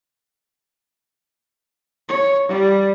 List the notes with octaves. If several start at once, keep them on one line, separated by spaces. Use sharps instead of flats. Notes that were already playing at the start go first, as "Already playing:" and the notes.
C#5
G3